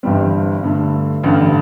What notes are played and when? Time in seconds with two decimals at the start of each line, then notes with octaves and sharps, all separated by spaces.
0.03 G1 G2 E3 G3 C4
0.63 G2 D3 A3
1.23 A1 G2 D3